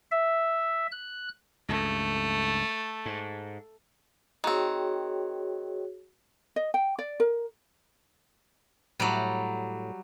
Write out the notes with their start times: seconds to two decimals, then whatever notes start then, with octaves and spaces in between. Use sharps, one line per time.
0.11 E5
0.92 F#6
1.69 C#2 G2 A3
3.06 G#2
4.44 D#3 C4 F#4 G#4 C#5
6.56 D#5
6.74 G5
6.99 D5
7.20 A#4
9.00 A2 F#3 G3